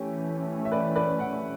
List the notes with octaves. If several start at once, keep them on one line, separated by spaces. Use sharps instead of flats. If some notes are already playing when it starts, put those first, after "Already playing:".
Already playing: E3 A3 C#4 G4
E5
B4 D5
B4 D5
D5 F#5